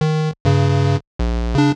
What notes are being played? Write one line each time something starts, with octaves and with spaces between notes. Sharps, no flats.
D#3
G2 C#3
A#1
C#3 D4